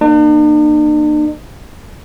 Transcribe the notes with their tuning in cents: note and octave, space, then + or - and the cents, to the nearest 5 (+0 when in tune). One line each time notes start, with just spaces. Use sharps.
A#3 +0 D4 +45